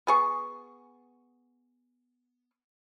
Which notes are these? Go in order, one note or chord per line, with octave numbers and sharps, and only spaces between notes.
B3 G#4 C#6